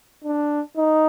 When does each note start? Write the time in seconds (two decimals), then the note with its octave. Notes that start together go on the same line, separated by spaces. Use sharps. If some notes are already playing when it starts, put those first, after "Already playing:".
0.25 D4
0.77 D#4